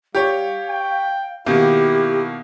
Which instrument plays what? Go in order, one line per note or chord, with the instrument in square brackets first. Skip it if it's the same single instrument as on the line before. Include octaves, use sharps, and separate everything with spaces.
[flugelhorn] G3 [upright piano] G4 C#5 [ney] F5
[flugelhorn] G5
[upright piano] B2 D#3 A#3 [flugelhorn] E4 [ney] G4